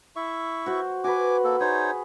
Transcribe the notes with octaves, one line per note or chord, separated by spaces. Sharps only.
E4 E5 C#6
F#4 C5
F#4 B4 G#5 D6
A#3 A4
D#4 G#4 C5 C#5